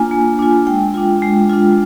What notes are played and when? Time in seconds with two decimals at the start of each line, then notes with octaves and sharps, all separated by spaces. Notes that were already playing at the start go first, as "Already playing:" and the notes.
Already playing: A#3 D4 F4 G#5
0.11 A#3
0.39 D4 F4
0.67 G#3 G5
0.94 D4 F4
1.22 G#3
1.49 D4 F4